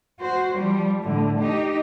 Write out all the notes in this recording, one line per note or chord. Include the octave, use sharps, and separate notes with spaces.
F#4 C5
F3 G3
A2 D3
D#4 G4